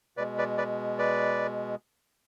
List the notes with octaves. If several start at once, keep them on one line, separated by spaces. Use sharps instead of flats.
B2 G#3 B4 D5
B4 D5
B4 D5
B4 D5